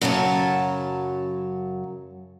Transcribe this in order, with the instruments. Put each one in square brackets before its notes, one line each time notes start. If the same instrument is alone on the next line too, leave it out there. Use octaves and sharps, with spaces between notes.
[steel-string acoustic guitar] F#2 C#3 F#3 C#5 A5